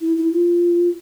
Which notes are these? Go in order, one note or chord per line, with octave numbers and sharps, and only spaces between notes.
E4
E4
F4